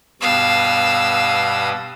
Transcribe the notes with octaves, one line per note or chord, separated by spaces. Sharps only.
G2 B2 F5 D#6 E6